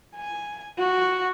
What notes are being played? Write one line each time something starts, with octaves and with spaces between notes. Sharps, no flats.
G#5
F#4